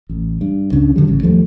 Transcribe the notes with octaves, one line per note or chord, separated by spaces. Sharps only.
A1
G2
C#2 C#3 D4
G#2 D3 F#3 G3
A1 C#3
D#2 F3 G3 A3